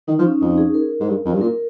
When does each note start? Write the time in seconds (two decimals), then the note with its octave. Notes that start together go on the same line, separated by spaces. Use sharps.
0.08 D#3 D#4
0.19 F3
0.24 C#4
0.41 F2 D#4
0.58 G#4
0.74 A#4
1.00 G#2
1.08 G2
1.25 F2
1.34 G2
1.41 A#2 A#4